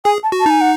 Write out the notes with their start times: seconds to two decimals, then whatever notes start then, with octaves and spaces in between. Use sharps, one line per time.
0.05 G#4 G#5
0.23 A5
0.32 F#4
0.40 A5
0.46 D#4 G#5
0.61 F#5